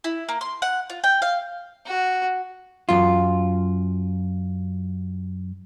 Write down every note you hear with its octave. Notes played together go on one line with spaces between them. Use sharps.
E4
A#3
C6
F#5
F4
G5
F5
F#4
F#2 F4